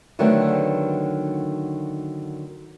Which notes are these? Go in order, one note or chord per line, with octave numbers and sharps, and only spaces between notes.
D3 D#3 F#3 A3 B3 C4